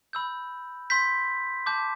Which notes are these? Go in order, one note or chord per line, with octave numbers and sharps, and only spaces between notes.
B5 E6 G6
C6 G6 B6
A5 D6 G6